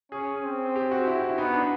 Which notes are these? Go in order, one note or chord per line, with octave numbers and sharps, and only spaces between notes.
C#4 G#4
C4
G4
F#4
E4
E4
B3 D#4
D4